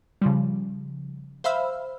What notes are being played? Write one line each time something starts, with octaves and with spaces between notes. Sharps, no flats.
C#3 F3 G3
C5 E5 F5 B5 E6 F6